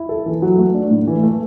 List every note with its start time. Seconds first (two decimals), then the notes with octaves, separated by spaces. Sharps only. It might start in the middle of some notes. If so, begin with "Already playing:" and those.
Already playing: E4
0.09 A4
0.26 E3
0.42 F#3
0.58 A3
0.74 D4
0.91 A2
1.07 E3
1.23 A3